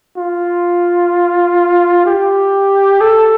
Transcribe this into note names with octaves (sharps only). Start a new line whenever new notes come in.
F4
G4
A4